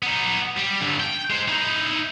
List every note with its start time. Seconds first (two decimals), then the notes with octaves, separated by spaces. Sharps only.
0.03 B3 D#4
0.58 G3
0.81 G2 D3
1.00 G5
1.30 G#3 C5
1.48 D#4 E4